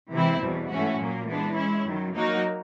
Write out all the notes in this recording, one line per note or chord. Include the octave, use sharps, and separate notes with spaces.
C3 E3 G#3 C4 E4
E2 B2 G3
G#2 E3 A3 C#4 F#4
A#2 F#3 A#3
E3 G#3 B3 D4
G#3 C#4 E4
F#2 D#3 F#3
F#3 A#3 D#4 F#4 A#4